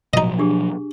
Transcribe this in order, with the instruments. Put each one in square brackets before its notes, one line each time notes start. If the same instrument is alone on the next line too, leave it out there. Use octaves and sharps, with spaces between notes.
[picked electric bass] B2 F3 F#3 [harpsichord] D#4 D#5
[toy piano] D4 G4 G#4